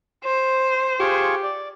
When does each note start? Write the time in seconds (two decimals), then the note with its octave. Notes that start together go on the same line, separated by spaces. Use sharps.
0.24 C5
1.00 F4 G4 G#4 C#6
1.43 D5